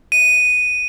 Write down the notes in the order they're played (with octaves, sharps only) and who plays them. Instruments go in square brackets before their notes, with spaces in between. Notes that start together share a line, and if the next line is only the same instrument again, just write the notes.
[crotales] D#7